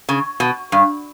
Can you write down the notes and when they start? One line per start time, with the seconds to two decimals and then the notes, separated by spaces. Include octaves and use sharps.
0.09 C#3
0.40 B2
0.72 G2